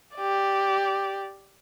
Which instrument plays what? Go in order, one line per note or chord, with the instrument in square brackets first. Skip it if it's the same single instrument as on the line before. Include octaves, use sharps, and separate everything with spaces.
[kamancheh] G4 D5